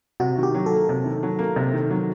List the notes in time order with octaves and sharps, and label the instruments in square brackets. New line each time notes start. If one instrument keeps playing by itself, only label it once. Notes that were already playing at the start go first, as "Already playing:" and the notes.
[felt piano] C3 [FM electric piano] F#4
[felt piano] D#3
[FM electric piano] G4
[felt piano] F#3
[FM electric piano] A4
[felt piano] A#3
C3
D#3
F#3
A#3
C3
D#3
F#3